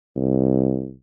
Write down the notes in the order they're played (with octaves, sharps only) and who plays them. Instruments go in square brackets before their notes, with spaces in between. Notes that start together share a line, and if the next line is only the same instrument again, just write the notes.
[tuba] C2